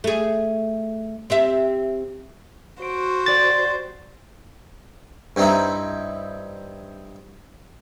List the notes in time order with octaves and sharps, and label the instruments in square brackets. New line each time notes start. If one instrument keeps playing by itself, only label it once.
[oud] A3 G#4
C4 G4 E5
[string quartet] F#4 C5 [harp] D7
[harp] G4 D5 [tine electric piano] A6
[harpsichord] G2 C4 D#4 E4